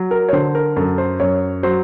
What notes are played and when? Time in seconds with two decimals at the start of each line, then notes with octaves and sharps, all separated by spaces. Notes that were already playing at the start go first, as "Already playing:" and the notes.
Already playing: F#3
0.11 A#4
0.29 C#5
0.33 D3 C5
0.55 A#4
0.76 F#2 A4
0.98 C5
1.20 F#2 C#5
1.63 F#3 C5